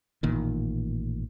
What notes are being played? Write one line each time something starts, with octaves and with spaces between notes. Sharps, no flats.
A1 A#2 D#3